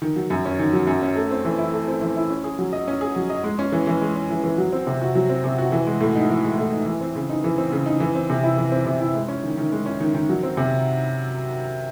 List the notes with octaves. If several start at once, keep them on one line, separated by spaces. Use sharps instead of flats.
D#3
F#3
F#2
C#4
D#3
F#3
F#2
C#4
A3
C4
E3
E4
A3
C4
E3
E4
C#4
G#4
F#3
D#5
C#4
G#4
F#3
D#5
G#3
C#4
E3
E3
G#3
C#4
E3
E3
F#3
C4
C3
F#4
F#3
C4
C3
F#4
E3
G#3
A2
D#4
E3
G#3
A2
D#4
E3
C4
C#3
D#4
E3
C4
C#3
D#4
E3
C4
C3
E4
E3
C4
C3
E4
G#3
C#4
D#3
D#3
G#3
C#4
D#3
D#3
F#3
C4
C3